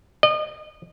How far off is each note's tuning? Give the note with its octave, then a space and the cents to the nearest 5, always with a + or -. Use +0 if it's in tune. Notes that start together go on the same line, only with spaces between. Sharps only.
D#5 -35